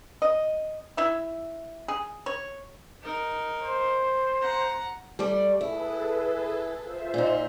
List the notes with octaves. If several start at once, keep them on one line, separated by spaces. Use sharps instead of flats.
D#5
E4 E5
G#4
C#5
D#4 A#4
C5
F#5 A#5
G3 A3 D5
E4 G#4 A4 B4
F4 C5 E5
A#2 D#4